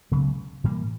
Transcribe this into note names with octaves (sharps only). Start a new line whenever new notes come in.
C#2 C#3 F#3 B3
A2 E3 G3 A#3